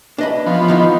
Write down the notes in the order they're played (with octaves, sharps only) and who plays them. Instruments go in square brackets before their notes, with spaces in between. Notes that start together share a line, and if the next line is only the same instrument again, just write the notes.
[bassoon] E3 [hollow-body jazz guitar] D4 D#5 B5
[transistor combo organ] F3 B3
[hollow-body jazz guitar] D#3 D#4 E4